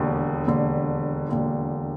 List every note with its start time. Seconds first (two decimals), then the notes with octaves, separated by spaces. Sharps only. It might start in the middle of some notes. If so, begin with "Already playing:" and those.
Already playing: E1 D#2 D3
0.47 E1 D#2 D3
1.29 E1 D#2 D3